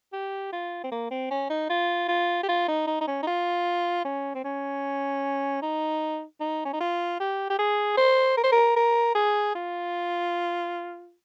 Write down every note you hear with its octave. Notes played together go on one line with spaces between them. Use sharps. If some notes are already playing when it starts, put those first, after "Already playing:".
G4
F4
C4
A#3
C4
C#4
D#4
F4
F4
G4
F4
D#4
D#4
D#4
C#4
D#4
F4
C#4
C4
C#4
D#4
D#4
C#4
D#4
F4
G4
G4
G#4
C5
A#4
C5
A#4
A#4
G#4
F4